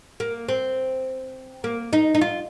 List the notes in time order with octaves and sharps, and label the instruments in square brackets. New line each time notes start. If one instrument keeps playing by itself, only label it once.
[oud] A#3
C4
A#3
D#4
D#4
F4